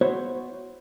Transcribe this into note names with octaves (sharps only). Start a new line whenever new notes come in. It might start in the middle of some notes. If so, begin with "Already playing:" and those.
B3 E4 F#4 C5 C#5